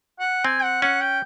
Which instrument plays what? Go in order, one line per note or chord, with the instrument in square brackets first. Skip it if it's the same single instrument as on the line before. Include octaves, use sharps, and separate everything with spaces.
[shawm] F#5
[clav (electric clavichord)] C4 [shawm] G#5
[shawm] F#5
[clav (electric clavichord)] C#4 [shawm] F#5
[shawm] G5